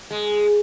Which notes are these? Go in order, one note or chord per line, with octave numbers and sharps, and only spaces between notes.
G#3